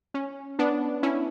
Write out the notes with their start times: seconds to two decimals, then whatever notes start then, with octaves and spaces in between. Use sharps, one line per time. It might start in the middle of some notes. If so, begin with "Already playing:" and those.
0.14 C#4
0.59 B3 D4
1.03 C#4 E4